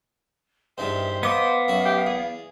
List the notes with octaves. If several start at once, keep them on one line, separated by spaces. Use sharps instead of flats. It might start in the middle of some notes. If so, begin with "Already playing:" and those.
E2 G2 D#3 C5 E5
B3 D#5 F5 D6
F#2 F#4
G4
E2 G#4